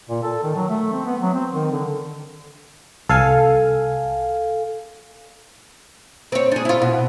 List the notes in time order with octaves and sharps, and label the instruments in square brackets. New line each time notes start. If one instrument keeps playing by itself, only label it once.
[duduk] A#2
A4
D#3
F#3
A3
C4
B3
F#3
C4
D#3
D3
[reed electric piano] C2 [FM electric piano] A4 F5 G#5
[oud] C4 C#5
D4 G#4
E4 F4
B2